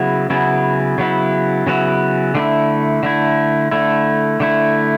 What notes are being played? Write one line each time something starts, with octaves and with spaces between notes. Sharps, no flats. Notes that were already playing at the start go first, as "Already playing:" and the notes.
Already playing: C#3 F#3 B3 E4
C#3 F#3 B3 E4
C#3 F#3 B3 E4
C#3 F#3 B3 E4
D3 A3 E4
D3 A3 E4
D3 A3 E4
D3 A3 E4